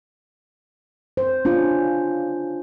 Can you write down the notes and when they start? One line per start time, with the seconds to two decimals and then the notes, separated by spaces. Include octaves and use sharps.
1.17 C5
1.45 C#4 D4 F4